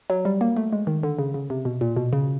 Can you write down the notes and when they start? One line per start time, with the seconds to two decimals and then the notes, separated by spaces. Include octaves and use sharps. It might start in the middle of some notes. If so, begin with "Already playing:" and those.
0.10 F#3
0.25 G3
0.41 A#3
0.57 A3
0.72 G#3
0.87 D#3
1.03 D3
1.19 C#3
1.34 C#3
1.50 C3
1.65 B2
1.81 A#2
1.96 B2
2.13 C#3